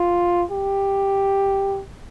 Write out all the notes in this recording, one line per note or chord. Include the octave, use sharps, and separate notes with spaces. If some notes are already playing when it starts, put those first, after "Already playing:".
Already playing: F4
G4